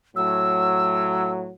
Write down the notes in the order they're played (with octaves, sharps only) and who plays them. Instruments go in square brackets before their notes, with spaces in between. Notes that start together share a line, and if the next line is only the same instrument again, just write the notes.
[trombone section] A2 F#3 [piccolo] E6